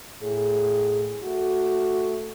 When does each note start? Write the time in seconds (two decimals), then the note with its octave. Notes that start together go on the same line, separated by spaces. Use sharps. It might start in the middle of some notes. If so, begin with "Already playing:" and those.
0.22 A2 G#4
1.23 A3 F#4